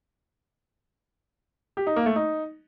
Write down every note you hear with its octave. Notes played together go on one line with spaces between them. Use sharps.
G4
D#4
A#3
A3
D#4